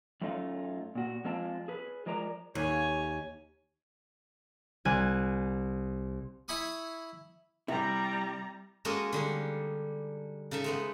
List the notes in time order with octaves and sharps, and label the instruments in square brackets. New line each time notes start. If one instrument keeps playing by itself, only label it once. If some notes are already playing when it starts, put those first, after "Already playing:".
[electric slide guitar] F#2 A3 C#4 D#4 F4
A#2 F#4
F2 G#3 C4 F4 A5
G#4 B4
F3 G#3 A#4 D5 A#5
[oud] D#2 [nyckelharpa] C#5 G#5
[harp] C2 G#5 F#6
[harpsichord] E4 G#5 B5 C#6 D#6
[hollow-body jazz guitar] C3 E4 [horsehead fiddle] G3 A#5 [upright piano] E5 G5
[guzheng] G#3 A#3 C#4 F#4 A4 D#5
D3 G3 D#4
C#3 D#4 A4 E5
G#3 A3 B3